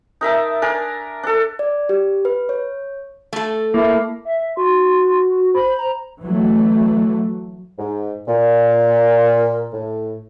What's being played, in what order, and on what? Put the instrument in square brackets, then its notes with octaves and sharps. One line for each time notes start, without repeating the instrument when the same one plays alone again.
[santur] D#4 A#4 E5 A5
D4 A#4 G#5
D4 A4
[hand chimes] D5
G4
B4
C#5
[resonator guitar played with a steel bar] A3 A4
[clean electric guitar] A#3 [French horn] E4
[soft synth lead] E5
[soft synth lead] F#4 [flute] C6
[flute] C5 [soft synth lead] B5
[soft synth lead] A#5
[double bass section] E3 F#3 A3
[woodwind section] G#2
A#2
A2